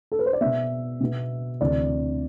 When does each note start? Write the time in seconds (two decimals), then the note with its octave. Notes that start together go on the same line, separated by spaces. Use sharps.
0.12 A4
0.19 B4
0.26 C5
0.33 D5
0.41 B2 B3 E5
1.01 B2 B3
1.61 D2 C3 E3 D5